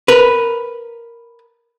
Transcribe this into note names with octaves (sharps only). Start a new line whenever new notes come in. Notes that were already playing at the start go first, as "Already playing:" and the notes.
A#4 B4